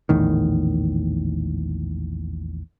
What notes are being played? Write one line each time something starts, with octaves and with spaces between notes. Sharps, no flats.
A#1 E2 A2 D#3